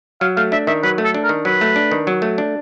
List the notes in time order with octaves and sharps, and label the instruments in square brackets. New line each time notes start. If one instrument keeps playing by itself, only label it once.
[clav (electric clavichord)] F#3 [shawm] F5
[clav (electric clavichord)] A3 [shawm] F5
[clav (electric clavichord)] D4 [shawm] E5
[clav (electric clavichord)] D#3 [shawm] E5
[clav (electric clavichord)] F#3 [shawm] B4
[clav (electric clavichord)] A3
[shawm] A4
[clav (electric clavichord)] D4
[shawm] A#4
[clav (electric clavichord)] D#3
[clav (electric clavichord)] F#3 [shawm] B4
[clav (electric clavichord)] A3
D4
D#3
F#3
A3
D4